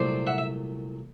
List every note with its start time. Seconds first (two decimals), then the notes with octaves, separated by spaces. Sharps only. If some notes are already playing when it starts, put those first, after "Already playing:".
Already playing: C2 A#2 F#3 A3 C5 D5
0.27 E5 F#5
0.38 E5